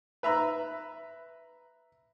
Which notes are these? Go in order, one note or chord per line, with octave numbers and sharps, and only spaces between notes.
B4 E5 A#5 B5